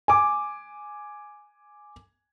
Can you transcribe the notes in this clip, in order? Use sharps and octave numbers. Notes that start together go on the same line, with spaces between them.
G#5 D6